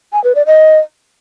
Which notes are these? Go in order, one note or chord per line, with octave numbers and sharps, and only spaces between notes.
G#5
B4
D5
D#5